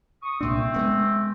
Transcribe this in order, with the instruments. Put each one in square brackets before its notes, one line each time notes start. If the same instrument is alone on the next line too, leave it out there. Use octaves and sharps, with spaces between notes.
[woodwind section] C#6 D#6
[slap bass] C2 A#2 D4 [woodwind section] A3 C4
[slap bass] G#3 A#3 B3